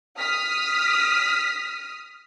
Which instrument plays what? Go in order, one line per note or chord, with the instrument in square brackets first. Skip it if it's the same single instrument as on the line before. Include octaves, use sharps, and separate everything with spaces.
[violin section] D#6 F6 B6